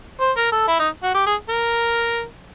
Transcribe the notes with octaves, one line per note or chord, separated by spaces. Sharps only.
C5
A#4
A4
E4
D#4
F#4
G4
G#4
A#4